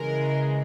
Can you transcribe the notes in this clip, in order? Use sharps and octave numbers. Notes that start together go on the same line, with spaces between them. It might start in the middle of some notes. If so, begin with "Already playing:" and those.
Already playing: C#3 E3 G#3 A#4